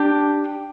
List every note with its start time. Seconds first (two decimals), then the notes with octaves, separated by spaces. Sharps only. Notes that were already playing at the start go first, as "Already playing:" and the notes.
Already playing: D4 G4